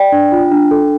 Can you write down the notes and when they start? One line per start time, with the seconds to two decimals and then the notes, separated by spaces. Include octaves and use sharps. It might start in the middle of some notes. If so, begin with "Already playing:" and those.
Already playing: D5 G5
0.12 D4
0.32 F4
0.51 D4
0.71 A4